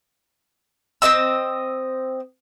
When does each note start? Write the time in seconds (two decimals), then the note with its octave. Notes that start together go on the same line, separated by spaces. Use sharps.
1.02 C4 C#4 D#5 E6